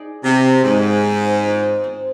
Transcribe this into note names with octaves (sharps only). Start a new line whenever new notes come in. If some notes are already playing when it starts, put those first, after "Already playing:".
Already playing: D#4 G#4 D5
C3 C4
G#2 D#4 G#4 D5
C4
F4 C5 D#5
C4